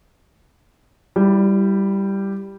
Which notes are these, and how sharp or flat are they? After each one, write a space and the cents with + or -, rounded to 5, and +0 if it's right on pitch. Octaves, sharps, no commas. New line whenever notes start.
G3 +0 E4 +20